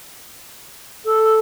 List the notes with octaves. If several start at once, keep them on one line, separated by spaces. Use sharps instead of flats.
A4